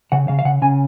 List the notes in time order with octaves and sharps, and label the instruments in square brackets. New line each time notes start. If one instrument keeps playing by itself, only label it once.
[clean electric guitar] C#3 F#5
C#3 F5
F5
C#3 F#5
C#3 G#5